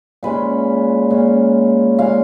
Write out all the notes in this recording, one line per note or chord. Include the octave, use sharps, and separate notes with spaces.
A#2 G#3 C#4 B4
A#2 G#3 C#4
A#2 G#3 C#4 F5